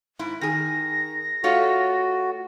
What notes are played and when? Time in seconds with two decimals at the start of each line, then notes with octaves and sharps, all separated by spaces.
0.19 G#2 E4
0.41 D#3 G#4 A#6
1.44 A3 F4 F#4 C#5